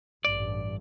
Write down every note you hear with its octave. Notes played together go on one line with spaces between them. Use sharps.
A1 G2 D5